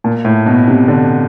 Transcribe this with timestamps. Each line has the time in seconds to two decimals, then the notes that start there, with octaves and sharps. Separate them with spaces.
0.04 A#2
0.25 A2
0.46 B2
0.67 C3
0.88 D3